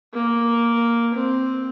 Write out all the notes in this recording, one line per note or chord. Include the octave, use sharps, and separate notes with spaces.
A#3
C4